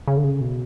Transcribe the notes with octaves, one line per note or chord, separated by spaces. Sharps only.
C#3
D3
C#3
B2